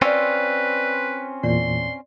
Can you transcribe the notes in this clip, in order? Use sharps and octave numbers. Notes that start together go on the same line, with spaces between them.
C4 C#4 F4 B4 D5 E6
E2 A#2 D5 C6